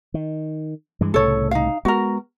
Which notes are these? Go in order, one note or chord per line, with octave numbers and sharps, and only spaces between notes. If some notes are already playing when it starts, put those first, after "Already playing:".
D#3
G2 E3 G#3
C2 A2 C#3 A4 C#5
D#4 F5
G#3 B3 F#4 A#4